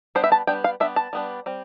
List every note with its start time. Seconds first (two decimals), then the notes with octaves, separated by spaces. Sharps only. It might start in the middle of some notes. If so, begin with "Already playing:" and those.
0.15 G3 B3 D4 C5
0.24 E5
0.32 A5
0.47 G3 B3 D4 G5
0.64 F5
0.80 G3 B3 D4 E5
0.96 A5
1.13 G3 B3 D4
1.46 G3 C4